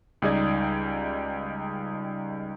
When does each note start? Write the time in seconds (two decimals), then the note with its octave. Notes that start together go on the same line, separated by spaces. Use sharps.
0.22 C#2 G3 D#4 G#4 D5 G#6